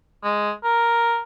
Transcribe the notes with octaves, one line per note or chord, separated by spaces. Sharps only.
G#3
A#4